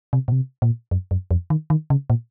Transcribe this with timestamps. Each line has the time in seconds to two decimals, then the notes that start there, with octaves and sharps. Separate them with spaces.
0.13 C3
0.28 A#2
0.32 C3
0.62 A#2
0.91 F#2
1.11 F#2
1.31 F2
1.50 D#3
1.70 D#3
1.90 C#3
2.10 A#2